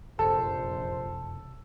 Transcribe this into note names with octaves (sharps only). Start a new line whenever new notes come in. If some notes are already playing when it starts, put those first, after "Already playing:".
F1 A#1 F#2 A4 C5 A5